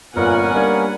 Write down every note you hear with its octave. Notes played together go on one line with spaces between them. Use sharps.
G1 A#2 B3 C#4 F4 A#4 F#5 G#5
G3 A#3 D4 G#6